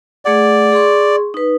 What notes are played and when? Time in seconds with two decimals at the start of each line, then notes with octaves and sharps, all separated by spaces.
0.25 A3 G#4 D5 F#5
0.72 G#4 C6 C#6
1.34 D#4 B4